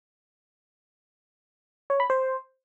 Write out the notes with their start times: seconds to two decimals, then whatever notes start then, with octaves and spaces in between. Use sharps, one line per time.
1.90 C#5
2.00 B5
2.10 C5